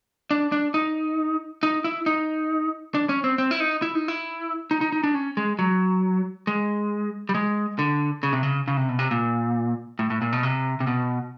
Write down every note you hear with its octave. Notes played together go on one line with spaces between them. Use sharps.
D4
D4
D#4
D#4
E4
D#4
D4
C#4
C4
C4
E4
D#4
E4
D#4
E4
D#4
D#4
D#4
D4
C#4
G#3
F#3
G#3
G3
G#3
D3
C#3
C3
C#3
C#3
C3
B2
C3
A#2
A2
A2
A#2
B2
C3
C3
B2